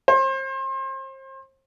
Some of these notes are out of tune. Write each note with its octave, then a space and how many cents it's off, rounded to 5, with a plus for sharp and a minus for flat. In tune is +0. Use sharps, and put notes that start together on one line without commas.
C5 +35